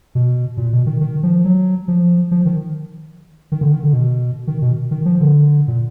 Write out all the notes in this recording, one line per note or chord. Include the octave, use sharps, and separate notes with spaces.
B2
A#2
B2
D#3
D#3
F3
F#3
F3
F3
D#3
D#3
D3
D#3
D3
B2
D#3
B2
D#3
F3
D3
A#2